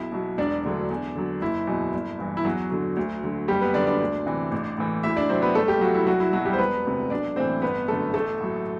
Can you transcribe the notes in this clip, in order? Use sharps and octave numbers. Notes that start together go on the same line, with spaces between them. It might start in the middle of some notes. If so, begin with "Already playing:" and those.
Already playing: B1 E4
B2 F#3
E1 D4 D5
D2 D3 F#3
E2
D3 F#3
F#1 E4
E2 B2 F#3
G1
G2 E3
E4
E2 F#3 F#4
D3 F#3
D2
D3 F#3
F#1 G3 G4
B3 B4
F#2 D3 D4 D5
D4 D5
D2
C3 E3
A1
A2 E3
D2 E4 E5
D4 D5
C3 F#3 C4 C5
B3 B4
G1 A3 A4
G3 G4
G2 F#3 F#4
E4
C2 F#3 F#4
E4
B2 F#3 F#4
G3 G4
C5
E1 B3 B4
D2 C3
B1 D4 D5
A2 E3 C4 C5
G1 B3 B4
F#2 D3 A3 A4
A1 A3 A4
A2 F#3